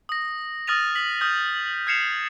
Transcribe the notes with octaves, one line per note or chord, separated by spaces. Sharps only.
D#6 A#6
D#6 F6 A6 A#6 D#7 F7
B6 F#7
D#6 F6 G6
F6 G#6 C7 C#7 E7 F7